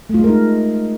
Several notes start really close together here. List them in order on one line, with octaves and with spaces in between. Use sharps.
A3 F4 G#3 A#4 D#4